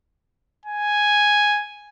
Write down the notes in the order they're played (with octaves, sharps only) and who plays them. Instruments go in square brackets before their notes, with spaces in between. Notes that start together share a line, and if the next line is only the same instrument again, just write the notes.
[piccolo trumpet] G#5